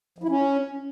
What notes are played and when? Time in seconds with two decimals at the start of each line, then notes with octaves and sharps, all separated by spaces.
0.18 F3
0.24 E4
0.29 C#4